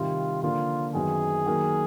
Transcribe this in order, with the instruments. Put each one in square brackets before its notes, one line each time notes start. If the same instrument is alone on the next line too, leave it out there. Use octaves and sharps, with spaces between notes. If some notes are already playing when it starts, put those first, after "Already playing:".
Already playing: [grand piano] C3 D#3 G3 [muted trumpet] F4
[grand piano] D3 F3 A#3 D4 [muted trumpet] F4
[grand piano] F#2 D#3 F#3 B3 [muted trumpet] G#4
[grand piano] D#3 F#3 A#3